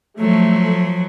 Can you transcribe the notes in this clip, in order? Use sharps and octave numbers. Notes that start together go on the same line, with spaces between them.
F3 F#3 A3